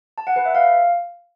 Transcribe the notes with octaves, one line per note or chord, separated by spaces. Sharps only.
A5
F#5
B4
E5
F5